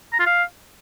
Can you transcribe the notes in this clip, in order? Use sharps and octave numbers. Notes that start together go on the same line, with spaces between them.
A#5
F4
F5